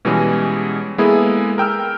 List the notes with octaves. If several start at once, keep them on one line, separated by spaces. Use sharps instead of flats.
B2 E3 G3 G#3 C#4 G#4
G#3 A#3 B3 E4 G#4 A4
A#4 G5 E6 F6